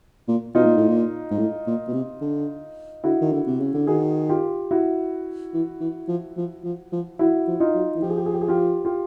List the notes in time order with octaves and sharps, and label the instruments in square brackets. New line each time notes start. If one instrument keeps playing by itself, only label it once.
[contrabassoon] A#2
[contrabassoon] B2 [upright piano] D#4 F4
[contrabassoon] A#2
A2
A#2
G#2
A2
A#2
B2
C3
D3
[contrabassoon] D3 [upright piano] E4 F#4
[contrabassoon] D#3
D3
C3
C#3
D3
[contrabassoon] D#3 [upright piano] F#4 G#4
[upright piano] F4 G4
E4 F#4
[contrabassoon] E3
E3
F3
F3
F3
F3
[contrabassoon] E3 [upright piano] E4 F#4
[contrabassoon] F3
[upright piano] D#4 F4
[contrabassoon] F#3
E3
[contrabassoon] F3 [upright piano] G4
[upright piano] G#4
G4
G#4
G4
G#4
F4 G4
F4 G4